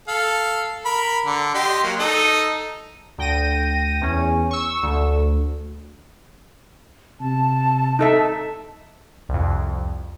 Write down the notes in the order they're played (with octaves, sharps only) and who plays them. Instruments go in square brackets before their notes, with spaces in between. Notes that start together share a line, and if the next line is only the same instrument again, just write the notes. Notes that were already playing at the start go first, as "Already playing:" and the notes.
[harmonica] A4 F5
A#4 B5
D3
G4 D#5 C6
F#3 A#3
D#4 A4 D#5
[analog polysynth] D2 G5 A#6 D#7
E2 C#4
C#6 E6
D2
[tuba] C3 [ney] A5
[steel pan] D#4 A4 E5
[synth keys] C2 F2